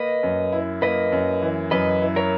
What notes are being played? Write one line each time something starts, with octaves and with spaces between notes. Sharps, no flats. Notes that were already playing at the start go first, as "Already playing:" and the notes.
Already playing: A#3 B4 D#5
F#2
E4
A#3 B4 D#5
F#2
E3
F#2 B4 D#5
E4
A#4 C#5